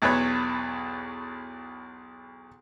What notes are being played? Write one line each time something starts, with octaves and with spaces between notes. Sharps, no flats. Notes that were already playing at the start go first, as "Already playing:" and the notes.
B1 E2 B4 C#5